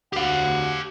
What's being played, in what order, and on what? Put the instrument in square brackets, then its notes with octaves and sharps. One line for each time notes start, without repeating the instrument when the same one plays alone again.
[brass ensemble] D2 F#5 [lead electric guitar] G4 F5